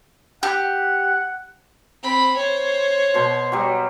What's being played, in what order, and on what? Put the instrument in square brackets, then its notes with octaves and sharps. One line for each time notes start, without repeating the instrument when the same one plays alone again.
[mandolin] G4 [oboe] F#5
[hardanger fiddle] C4 B5
C5 C#5
[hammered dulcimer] B2 C6
F#3 G3